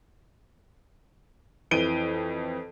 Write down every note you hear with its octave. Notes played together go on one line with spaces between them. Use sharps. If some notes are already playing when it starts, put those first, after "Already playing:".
F2 E3 D7 D#7 G7